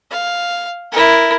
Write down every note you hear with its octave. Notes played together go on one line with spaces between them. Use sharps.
F5
E4 A#4